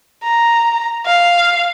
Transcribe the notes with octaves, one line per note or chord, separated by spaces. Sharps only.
A#5
F5